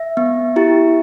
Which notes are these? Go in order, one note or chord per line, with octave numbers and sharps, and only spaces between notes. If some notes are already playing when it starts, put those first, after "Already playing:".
Already playing: E5
B3
E4 G4